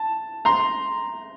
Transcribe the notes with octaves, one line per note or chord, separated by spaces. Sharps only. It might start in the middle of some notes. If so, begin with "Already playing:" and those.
Already playing: A5
A#5 C6